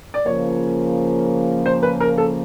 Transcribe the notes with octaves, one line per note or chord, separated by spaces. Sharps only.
D5
C#3 F3 A#3 C#5
C5
B4
A#4
A4